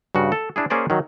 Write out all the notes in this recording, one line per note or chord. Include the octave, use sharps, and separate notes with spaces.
G2 C#3 F#4
A4
D4 E4 G#4
A#3 C#4 G#4 C5 D5 A#5
D#3 F#3